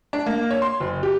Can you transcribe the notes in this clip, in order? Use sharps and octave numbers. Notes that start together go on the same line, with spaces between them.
D4
A#3
C#5
C6
F#1
G4